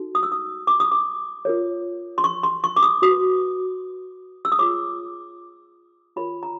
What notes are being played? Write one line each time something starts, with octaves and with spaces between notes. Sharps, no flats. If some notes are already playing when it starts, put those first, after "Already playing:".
Already playing: D#4 F#4 A4
D#6
E6
D#6
D6
D#6
D6
F4 A#4 C#5
C6
C#6
C6
C#6
D6
D#6
F#4 B4 D#6
E6
D#6
F4 G#4 C#5 D6
F4 A#4 C#5 B5
A#5